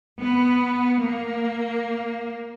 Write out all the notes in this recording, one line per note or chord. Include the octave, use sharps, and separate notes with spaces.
B3
A#3